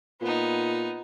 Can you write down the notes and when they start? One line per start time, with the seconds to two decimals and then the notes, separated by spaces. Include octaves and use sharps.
0.21 A#2 B3 D#4